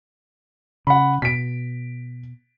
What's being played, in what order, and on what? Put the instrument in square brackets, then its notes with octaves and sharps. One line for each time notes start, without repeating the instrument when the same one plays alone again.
[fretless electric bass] C#3 [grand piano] F#5 B5
[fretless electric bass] B2 [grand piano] B6 D7